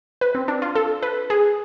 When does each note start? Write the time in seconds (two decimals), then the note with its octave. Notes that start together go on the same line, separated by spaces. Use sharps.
0.21 B4
0.35 C4
0.48 D4
0.62 F4
0.75 A4
1.03 B4
1.30 G#4